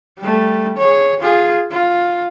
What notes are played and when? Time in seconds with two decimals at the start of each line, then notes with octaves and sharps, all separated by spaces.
0.19 G3 A3
0.78 G#4 C#5
1.20 F4 G#4
1.71 F4